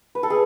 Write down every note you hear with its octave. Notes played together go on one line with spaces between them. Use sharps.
B4
A4
G#4